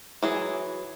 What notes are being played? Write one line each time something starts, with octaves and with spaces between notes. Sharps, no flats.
E3 F#3 G#4